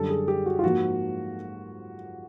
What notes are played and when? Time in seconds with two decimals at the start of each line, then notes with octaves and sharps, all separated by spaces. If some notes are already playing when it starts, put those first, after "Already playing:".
Already playing: F#2 D3 G3 A4
0.10 G#4
0.28 G4
0.46 F#4
0.59 F4
0.64 G#2 F3 A#3 F#4